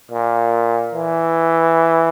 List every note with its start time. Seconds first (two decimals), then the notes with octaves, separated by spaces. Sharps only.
0.11 A#2
0.95 E3